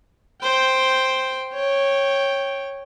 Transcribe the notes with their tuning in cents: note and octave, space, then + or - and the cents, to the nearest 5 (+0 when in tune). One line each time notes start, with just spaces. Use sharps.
C5 +0 G5 +0
C#5 -10 G5 +0